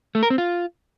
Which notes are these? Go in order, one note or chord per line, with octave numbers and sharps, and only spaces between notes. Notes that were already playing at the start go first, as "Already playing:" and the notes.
A3
A#4
C4
F4